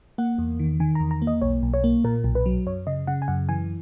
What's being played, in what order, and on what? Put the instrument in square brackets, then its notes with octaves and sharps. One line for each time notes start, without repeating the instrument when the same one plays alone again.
[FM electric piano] A#3 F#5
E2
D#3
D#3 G#5
A#5
E2
A#5
A#3
D#5
B1 C#5
B1
C#5
A#3
A#2 A#4
B1
B4
F#3
F#2 C#5
C#3 D#5
C#3 F#5
G#5
F#2 F#5
E3 G#5